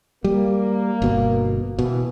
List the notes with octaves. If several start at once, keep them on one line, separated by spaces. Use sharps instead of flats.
G3 A#3
G1 B2
B2 E3